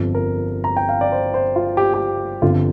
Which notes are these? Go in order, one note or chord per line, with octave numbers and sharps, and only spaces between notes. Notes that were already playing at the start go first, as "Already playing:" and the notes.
Already playing: G1 F2 F3
A#4
A#5
G5
F5
D5
C5
C5
F4
G4
G4
G1 F2 D3 F4